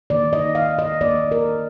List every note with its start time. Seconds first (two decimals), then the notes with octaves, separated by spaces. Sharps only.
0.10 D#3 A#3 D5
0.33 D#5
0.55 F5
0.79 D#5
1.00 D#3 A#3 D5
1.32 A#4